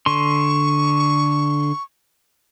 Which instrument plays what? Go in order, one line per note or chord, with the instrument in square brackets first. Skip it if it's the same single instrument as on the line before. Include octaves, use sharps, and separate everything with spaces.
[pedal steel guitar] D3 C6 [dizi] C#6